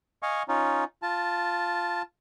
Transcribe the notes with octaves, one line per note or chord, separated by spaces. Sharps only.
D#5 F5 G#5 C#6
C#4 D#4 F4
F4 A5